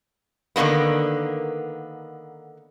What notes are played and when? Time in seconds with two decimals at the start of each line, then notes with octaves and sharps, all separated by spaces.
0.56 D3 D#3 F#3 A#3 B3